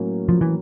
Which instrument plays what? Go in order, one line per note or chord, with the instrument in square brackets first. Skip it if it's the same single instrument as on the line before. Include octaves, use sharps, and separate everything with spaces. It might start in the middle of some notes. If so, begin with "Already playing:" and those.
Already playing: [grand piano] A2 F#3 A#3 C#4
[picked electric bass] F3
E3